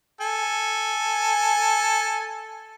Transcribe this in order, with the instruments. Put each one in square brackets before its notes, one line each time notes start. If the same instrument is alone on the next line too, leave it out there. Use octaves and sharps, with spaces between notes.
[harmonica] A4 G#5